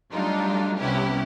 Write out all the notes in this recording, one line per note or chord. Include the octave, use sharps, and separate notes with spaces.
F#3 G3 A3 D4 D#4 F4
C2 C3 B3 C#4 E4 G4